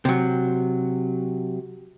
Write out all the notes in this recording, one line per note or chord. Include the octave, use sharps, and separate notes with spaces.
C3 F#3